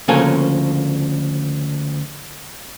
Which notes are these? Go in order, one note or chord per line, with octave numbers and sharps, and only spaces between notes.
D2 C#3 F3 A#3 A4 G#5